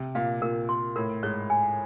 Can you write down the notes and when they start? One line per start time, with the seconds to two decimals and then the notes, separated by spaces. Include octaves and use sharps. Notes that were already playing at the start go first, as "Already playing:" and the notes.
Already playing: C3
0.15 A#2 F5
0.41 A#2 A#4
0.69 C6
0.96 A2 A#4
1.23 G#2 C#5
1.50 G#5